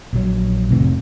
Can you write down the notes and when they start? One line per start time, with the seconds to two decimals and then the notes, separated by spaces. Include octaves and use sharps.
0.13 A#1 F#3
0.69 F1 A2 C3 D#3